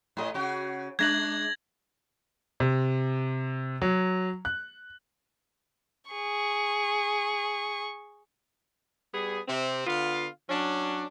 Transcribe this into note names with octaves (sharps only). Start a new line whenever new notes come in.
A2 G#4 D#5
C#3 F#4
G#3 D4 G#6 A#6 F#7
C3
F#3
F#6
G#4 C#6
G3 B3 G#4
C3 C4
D3 B3 F4 F5
F#3 C#4 D4